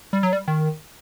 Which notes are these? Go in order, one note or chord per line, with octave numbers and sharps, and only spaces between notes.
G3
F#3
G3
D#3